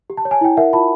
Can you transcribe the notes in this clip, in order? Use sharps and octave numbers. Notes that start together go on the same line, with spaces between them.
G4
A5
C#5
G#5
E4 G5
A#4 E5 F#5
F4 A5 B5